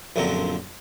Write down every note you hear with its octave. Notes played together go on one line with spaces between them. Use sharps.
A#1 F#2 D3 F3 C4 A#5